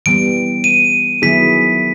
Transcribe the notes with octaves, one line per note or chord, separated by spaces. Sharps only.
E3 G3 B3 D7
D#7
D#3 F#3 B3 E4 G#4 B6